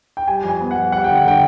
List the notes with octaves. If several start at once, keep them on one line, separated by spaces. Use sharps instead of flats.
G5
G3 G#5
F2
G#5
B3
F#5
F2
G3 F#5
D3 G5
F#5
D3 G5